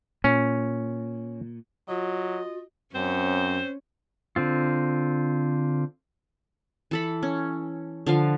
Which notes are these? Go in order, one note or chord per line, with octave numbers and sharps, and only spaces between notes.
A#2 C#4
F#3 F4 F#4 D#5
F#2 C4 C#4 C5
D3 C4 F4
E3 A4 B5
C#4
D3 F3 F5